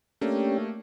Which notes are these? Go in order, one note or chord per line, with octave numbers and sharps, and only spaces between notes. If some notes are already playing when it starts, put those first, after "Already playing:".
A3 A#3 C#4 D4 G4